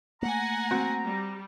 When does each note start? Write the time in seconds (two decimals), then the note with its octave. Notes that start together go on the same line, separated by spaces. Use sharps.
0.23 A3 A#3 F#5 G#5 A#5
0.71 C4 F#4 F#6
1.04 G3